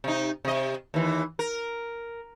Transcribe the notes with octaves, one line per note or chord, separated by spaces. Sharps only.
C3 D#4
C3 D#5
D#2 E3
A#4